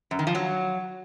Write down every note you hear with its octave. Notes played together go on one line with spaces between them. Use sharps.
F#2
D#3
F3
F#3